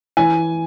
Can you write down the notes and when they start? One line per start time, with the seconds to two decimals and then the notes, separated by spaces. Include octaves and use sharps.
0.17 E3 G#5